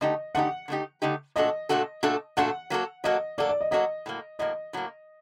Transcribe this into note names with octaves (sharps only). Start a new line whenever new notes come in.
D3 A3 D#4 G4 D#5
D3 A3 D#4 G4 F#5
D3 A3 D#4 G4
D3 A3 D#4 G4
A#2 A3 D4 F#4 A4 D#5
A#2 A3 D4 F#4 A4
A#2 A3 D4 F#4 A4
A#2 A3 D4 F#4 A4 F#5
F#3 A#3 F#4 A4
F#3 A#3 F#4 A4 D#5
F#3 A#3 F#4 A4 D5
D5
D#5
F#3 A#3 F#4 A4 D#5
A2 F#3 A#3
A2 F#3 A#3 D#5
A2 F#3 A#3